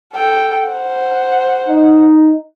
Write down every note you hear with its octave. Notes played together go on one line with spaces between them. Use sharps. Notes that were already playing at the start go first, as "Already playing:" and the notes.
A4 G5
C5 F#5
D#4